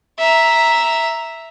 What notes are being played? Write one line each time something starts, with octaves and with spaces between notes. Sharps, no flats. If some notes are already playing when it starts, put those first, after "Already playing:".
E5 A#5